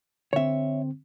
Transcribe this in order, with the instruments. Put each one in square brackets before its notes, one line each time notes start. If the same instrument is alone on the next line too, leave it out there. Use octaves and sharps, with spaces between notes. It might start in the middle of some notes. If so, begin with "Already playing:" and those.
[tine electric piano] D3 C4 [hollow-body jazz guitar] C#5 E5